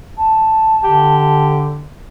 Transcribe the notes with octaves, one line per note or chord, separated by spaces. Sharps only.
A5
D3 G4